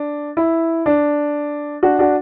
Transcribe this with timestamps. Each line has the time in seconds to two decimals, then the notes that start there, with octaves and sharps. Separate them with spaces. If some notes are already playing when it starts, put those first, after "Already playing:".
Already playing: D4
0.37 E4
0.86 D4
1.83 D4 F#4
1.99 D4 F#4